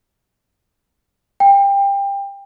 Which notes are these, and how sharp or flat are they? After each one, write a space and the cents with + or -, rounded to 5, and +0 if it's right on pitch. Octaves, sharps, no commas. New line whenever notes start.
G5 +25